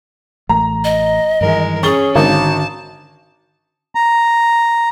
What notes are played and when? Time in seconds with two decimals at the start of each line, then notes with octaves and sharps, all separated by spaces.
0.49 A1 A3 A#5
0.84 D#5
1.41 G2 D#3 E3 G#3 A#4
1.83 C#4 G#4 C#6 A6 G7
2.16 G#1 D3 D#3 F#4 A5
3.95 A#5